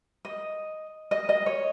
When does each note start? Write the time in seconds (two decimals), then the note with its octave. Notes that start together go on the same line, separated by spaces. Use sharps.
0.25 D#5
1.11 D#5
1.29 D#5
1.46 C#5